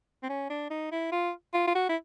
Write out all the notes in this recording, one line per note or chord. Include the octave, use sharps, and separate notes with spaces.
C4
C#4
D4
D#4
E4
F4
F4
F4
F#4
E4